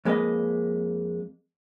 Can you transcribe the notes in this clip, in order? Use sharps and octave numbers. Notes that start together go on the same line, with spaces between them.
F2 G#3 A#3 B4 D#5